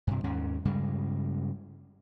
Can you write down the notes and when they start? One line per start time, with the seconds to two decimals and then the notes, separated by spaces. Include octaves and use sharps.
0.07 G2 C3
0.24 D#2 G#2 C#4
0.65 G2 C#3 G3 G#3